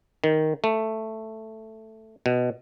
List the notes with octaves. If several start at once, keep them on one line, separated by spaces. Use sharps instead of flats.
D#3
A3
B2